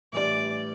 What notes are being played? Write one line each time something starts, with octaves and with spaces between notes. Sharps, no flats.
A2 E3 G3 D4 D5